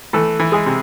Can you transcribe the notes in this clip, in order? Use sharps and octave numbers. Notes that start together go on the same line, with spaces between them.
E3 A3 A4
E3
G#3 G#4
C3